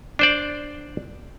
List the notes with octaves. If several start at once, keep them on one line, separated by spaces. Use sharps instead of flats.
D4 C5 D5